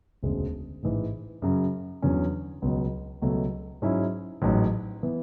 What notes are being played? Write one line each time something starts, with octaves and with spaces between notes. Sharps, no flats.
E1 D2 C#3 G#3
A1 G#2 E3
F#2 C#3 F#3
E2 D3 F#3 C#4
C#2 B2 F#3
C#2 B2 F#3 A3
G#2 F#3 C#4 E4
A1 G#2 F#3
E3 B3